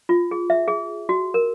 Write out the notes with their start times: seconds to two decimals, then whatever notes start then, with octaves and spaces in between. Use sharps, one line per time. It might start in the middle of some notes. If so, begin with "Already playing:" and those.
0.09 F4
0.31 G#4
0.50 E5
0.68 G#4
1.09 F#4
1.34 A#4